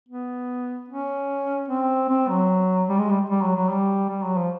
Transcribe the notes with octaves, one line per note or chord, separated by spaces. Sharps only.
B3
C#4
C4
C4
F#3
G3
G#3
G3
G3
F#3
F#3
G3
G3
F#3
F3